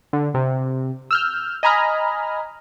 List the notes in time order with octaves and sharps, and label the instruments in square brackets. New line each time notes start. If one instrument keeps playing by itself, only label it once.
[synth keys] D3
C3
E6 F6 G6
D#5 G#5 A#5 B5 F6